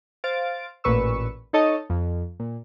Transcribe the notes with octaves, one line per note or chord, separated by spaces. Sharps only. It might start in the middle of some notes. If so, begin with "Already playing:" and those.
C5 F5 A6 D7
A1 A#2 B4 C#6 E6
D#4 A4 C#5 D#5 A5 D#6
F2
A#2